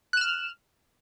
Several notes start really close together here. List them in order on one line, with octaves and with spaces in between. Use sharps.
F#6 E7 F6